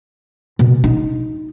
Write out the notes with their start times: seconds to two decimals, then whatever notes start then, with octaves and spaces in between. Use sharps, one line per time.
0.59 B2
0.84 D#4